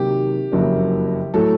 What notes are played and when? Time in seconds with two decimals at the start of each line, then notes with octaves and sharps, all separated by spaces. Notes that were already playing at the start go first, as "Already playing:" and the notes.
Already playing: C3 D#3 F#3 A#3 G4
0.52 F#1 F2 C#3 F#3 A#3
1.34 A2 F#3 A3 A4